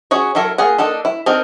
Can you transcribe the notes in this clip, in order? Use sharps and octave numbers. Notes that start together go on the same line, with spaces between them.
C#4 F#4 G#4 C#5
F#3 E4 A4 A#4
A#3 F4 G#4 F#5
A#3 D4 D#4 A4
E4
C4 D4 D#4 A#4